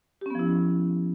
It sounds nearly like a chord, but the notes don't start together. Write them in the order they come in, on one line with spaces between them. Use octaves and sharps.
G4 C#4 B3 F3 E4